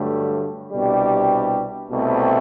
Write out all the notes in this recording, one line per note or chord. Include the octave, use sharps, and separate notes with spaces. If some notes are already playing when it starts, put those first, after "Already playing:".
Already playing: G2 D3 F#3 A3
C2 B2 G3 D4 G4
C2 B2 A3 C4